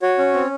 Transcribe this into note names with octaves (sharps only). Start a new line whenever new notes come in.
F#4 C#5
C#4
C4